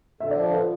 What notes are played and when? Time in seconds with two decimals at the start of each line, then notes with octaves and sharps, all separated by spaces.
0.20 D3 E5
0.31 D5
0.36 F3
0.52 B4